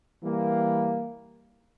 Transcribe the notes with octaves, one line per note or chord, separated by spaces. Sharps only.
E3 G3 A#3